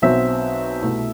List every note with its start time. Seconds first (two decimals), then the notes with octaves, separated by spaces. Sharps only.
0.02 B1 B2 F#3 C4 E5
0.82 C2 B2 A3